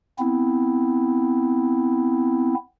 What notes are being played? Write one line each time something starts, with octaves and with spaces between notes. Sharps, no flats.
B3 C4 E4